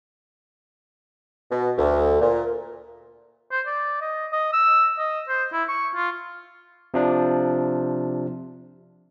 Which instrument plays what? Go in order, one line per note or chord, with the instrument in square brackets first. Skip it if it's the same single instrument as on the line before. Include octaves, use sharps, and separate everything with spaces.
[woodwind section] B2
D2
A#2
[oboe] C5
D5
D#5
D#5
E6
D#5
C5
E4
C#6
F4
[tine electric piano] C3 F3 D4